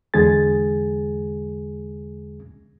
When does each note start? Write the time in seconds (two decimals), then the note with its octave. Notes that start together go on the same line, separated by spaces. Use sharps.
0.14 E2 D3 G#3 G#4 G#5 A6